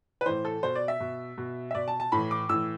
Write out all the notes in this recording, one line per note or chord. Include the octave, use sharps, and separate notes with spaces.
B4
A2 E3 C5
A4
B2 C5
D5
E5
B2
B2
E5
B2 D5
A5
A5
A2 E3 B5
D6
A2 E3 E6